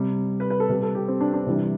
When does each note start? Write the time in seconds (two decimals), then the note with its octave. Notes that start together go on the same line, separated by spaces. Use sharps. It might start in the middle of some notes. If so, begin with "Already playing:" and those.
Already playing: C3 G3
0.40 B4
0.50 B4
0.60 A4
0.69 C3 G3 B4
0.83 A4
0.95 G4
1.08 C4
1.21 D4
1.34 D4
1.47 C3 E3 G3